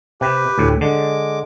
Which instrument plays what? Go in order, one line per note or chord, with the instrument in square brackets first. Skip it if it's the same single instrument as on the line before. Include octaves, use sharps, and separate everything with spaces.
[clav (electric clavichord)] C3 [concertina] G4 B4
[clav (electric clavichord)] D2 A2
[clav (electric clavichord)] D3 [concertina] G#3 D6